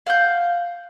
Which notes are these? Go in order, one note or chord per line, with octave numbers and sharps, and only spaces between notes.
F5 F#5 F6 G6